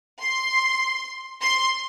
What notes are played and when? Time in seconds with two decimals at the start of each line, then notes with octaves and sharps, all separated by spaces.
0.21 C6
1.41 C6